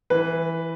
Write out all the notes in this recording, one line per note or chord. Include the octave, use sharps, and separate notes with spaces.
E3 B4